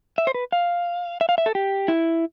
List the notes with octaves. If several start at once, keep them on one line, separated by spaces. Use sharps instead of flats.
E5
C5
B4
F5
E5
F5
E5
A4
G4
E4